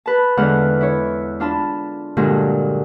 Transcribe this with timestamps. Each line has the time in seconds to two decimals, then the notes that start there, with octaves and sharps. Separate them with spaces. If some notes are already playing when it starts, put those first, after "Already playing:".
0.06 B4 A5
0.37 E2 D3 F3 G#3 F#5 F6
0.81 E4 C#5
1.40 D4 F4 A5 B5
2.17 G2 A#2 D3 F3 F#3 G#3